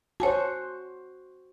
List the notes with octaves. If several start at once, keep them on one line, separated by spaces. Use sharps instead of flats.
F#4 C5 C#5 G#5 A5